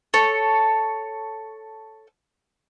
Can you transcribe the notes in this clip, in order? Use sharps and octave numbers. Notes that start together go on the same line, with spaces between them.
A4 C#5